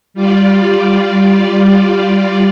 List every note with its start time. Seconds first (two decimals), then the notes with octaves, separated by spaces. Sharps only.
0.14 G3 F4 D5